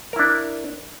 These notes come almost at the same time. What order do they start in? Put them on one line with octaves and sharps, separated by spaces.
A#4 E4 D4